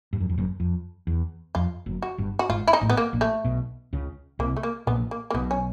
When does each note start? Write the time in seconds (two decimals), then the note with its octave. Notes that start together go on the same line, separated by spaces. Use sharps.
0.13 G2
0.20 F#2
0.29 F2
0.38 F#1 F#2
0.60 F2
1.07 E2
1.55 F2 F4
1.86 F#1 F#2
2.02 F#4
2.18 G1 G2
2.39 F#4
2.49 G#1 G#2 F4
2.68 E4
2.73 D#4
2.81 A1 A2
2.90 B3
2.97 A#3
3.13 A#1 A#2
3.21 A3
3.44 B1 B2
3.93 C#2 C#3
4.39 C2 C3 A#3
4.57 A3
4.63 A#3
4.87 A#1 A#2 B3
5.11 A#3
5.30 A#3
5.34 B1 B2 B3
5.51 C#4